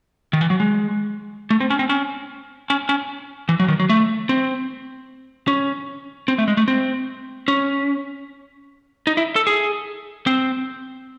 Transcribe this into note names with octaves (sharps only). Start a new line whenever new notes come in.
D#3
E3
F#3
G#3
A3
C4
C#4
C4
C#4
C#4
C#4
E3
F#3
D#3
F#3
A3
C4
C#4
C4
A3
G#3
A3
C4
C#4
D#4
E4
A4
G#4
C4